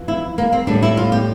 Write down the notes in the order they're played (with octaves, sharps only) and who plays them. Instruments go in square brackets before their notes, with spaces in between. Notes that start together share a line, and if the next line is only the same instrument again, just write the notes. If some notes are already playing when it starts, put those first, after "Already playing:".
Already playing: [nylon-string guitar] F2 E3
E4
A#3
C4
A2 G3 D4
E4
F4
G4